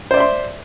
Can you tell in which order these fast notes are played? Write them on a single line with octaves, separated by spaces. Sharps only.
C5 D5 E5 C6